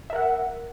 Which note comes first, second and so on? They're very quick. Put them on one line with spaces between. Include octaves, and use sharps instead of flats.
E5 A#4 F#5